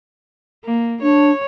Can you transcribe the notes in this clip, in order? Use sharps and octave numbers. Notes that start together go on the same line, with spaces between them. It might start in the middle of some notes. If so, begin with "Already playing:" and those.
A#3
D4 C#5